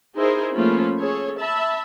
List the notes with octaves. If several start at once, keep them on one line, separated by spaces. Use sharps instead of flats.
D#4 E4 G#4 A#4 C5
F3 A3 A#3 C#4 F4 B5
C#4 G#4 A4 C#5
E5 A5 B5